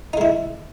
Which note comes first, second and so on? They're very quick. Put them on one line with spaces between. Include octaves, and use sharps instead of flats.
D#4 G#3 E4